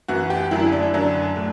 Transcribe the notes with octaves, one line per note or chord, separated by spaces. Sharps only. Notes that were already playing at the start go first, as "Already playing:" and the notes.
F#2 E3 F#4
G4
F#2 D3 F#3 E4
D4
F#2 D3 F#3 D4
A2